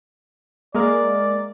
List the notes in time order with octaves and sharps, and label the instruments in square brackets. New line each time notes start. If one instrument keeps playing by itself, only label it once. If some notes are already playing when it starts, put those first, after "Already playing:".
[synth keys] G#3 A#3 A#4 [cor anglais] D5